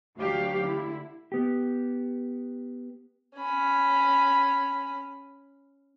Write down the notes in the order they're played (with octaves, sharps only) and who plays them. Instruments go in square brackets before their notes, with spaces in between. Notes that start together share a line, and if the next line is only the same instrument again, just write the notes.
[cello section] D2 F#3 D4 G4 F5
D3 E4
[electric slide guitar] B3 G4
[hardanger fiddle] C#4 B5